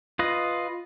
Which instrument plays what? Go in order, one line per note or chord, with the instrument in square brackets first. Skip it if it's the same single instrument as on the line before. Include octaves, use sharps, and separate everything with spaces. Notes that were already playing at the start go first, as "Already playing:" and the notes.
[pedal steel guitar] F4 B4 D#5